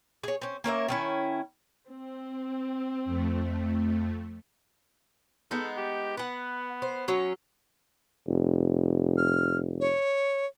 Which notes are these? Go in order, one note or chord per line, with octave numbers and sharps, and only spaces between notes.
G#4 C#5
C4 C#4
A#3 C#4 A#4 E5
D#3 C#4 E4
C4
F2 A3
G#3 B3 D#4 A4
G4
B3 B4 F#5
C5
F#3 C#4 C#5
F1
F6
C#5